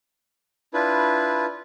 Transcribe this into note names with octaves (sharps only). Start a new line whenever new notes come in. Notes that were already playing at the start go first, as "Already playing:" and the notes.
D4 E4 F4 B4